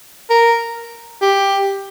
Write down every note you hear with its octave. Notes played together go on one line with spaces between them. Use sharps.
A#4
G4